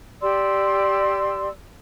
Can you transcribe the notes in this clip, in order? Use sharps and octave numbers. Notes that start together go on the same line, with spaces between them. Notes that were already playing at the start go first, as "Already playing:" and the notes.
G4 D5 C6 E6